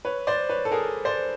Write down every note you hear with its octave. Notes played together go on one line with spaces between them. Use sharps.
B4 C#5
C5 D5
B4 C#5
A4
G#4 A#4
C5 D5